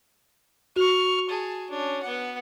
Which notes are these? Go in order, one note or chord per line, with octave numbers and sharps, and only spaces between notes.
F#4 C#6 F6
G#4 A5
C#4 D4
B3 F#5